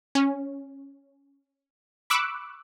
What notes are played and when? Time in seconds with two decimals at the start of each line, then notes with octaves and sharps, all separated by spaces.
0.15 C#4
2.10 B5 C#6 D6 E6 F#6